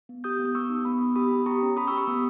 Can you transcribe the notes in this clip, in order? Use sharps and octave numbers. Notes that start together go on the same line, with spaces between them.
B3
G4 D#6 G6
B3
D#6
B3 C#6 E6
D#4
B3 B5 D#6
B3
G4 B5 D#6
B3
G4 A#5 C#6
C#4
G4 B5 D#6
C#6 E6
G4
C#6 E6
B3